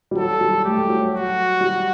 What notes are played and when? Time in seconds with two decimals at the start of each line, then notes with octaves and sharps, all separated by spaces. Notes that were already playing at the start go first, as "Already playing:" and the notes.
0.11 G3
0.16 F#3 A4
0.41 G3
0.65 A3 G4
0.77 A3
0.89 F#3
1.00 F#3
1.13 F#4
1.61 G3